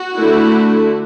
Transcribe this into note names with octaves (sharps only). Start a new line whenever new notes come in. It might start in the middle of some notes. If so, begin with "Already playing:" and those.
Already playing: F#4
D3 A3 E4